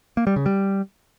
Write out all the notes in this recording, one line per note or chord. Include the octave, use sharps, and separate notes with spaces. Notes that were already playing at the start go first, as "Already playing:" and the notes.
A#3
G3
C#3
G3